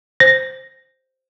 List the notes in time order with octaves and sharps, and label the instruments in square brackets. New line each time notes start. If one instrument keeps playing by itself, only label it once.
[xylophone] C5 [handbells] A#6